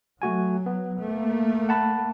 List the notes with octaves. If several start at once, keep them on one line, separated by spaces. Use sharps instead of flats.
F#3 A3 F#4 G#5
B3
A3 A#3
F#5 A5 B5